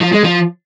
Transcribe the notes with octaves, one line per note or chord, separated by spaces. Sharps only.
F3
G#3
F3